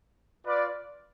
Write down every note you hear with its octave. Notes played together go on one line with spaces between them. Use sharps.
F4 B4 D5